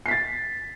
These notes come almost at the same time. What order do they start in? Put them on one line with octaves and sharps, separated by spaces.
C7 B6 A6